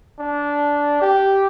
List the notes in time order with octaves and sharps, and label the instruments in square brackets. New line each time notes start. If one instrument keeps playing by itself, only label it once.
[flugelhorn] D4
G4